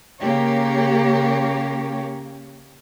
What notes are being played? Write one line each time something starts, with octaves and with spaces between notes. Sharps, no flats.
C#3 A#3 G4 C#5